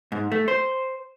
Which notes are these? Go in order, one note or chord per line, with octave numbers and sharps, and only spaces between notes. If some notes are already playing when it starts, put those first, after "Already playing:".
G#2
A3
C5